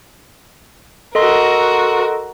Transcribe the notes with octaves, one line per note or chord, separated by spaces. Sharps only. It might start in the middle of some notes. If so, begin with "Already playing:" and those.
F#4 A4 A#4 D#5 C6